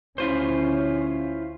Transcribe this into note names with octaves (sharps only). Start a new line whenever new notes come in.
D2 C#4 E4 F4 C5